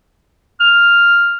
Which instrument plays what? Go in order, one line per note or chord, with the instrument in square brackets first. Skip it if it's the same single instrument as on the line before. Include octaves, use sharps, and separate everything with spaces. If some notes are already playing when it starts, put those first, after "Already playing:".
[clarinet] F6